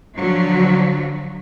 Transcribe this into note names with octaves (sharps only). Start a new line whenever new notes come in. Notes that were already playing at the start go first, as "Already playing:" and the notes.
D3 F3 F#3